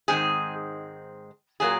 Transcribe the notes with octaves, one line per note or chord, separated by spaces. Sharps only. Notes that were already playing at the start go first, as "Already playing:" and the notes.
G#2 D#3 G#3 C4 G#4
A#2 F#3 A#3 G#4